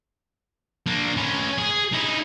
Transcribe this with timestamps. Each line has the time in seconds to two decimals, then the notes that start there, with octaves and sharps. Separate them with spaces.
0.86 A#3 D4
1.17 C#4 B4
1.58 G#4
1.92 D#4 E4